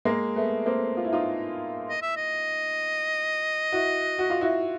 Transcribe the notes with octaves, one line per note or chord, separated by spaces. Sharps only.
G#3 A#3
A3 B3
A#3 C4
F4
E4
D#4 F4
D#5
E5
D#5
E4 F#4
F#4
F4
E4 F#4